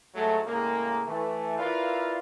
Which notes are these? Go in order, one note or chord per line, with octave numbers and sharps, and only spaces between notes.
G#2 F#3 G#3 A3
A2 C#3 G#3 A#3
E3 A3
E4 F4 A#4 B4 D5 F5